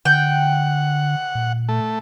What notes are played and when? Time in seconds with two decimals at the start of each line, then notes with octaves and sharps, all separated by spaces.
0.05 D3 F#5 G5
1.35 A#2
1.69 A3